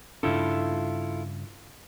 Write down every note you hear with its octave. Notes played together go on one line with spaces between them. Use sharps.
G2 C#3 D4 E4 F4 A4